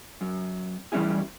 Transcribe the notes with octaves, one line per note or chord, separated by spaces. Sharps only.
F#2
A2 E3 G3 C#4 E4 G#4